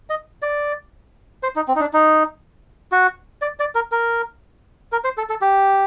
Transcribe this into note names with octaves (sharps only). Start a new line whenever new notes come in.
D#5
D5
C5
D#4
C4
D#4
D4
D#4
F#4
D5
D5
A#4
A#4
A#4
C5
A4
A4
G4